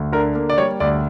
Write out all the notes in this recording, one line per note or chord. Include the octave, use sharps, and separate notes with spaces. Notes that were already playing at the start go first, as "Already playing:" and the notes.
Already playing: D2
D3 A#4
A#3
D5
G3 C#5
D2 D5